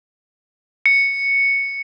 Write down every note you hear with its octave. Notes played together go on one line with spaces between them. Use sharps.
C#7